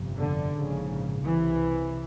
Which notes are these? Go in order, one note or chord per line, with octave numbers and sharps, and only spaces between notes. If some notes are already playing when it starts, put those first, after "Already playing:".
Already playing: G1 F2 C3
D3
A#1 G#2 C#3
C2 C3 E3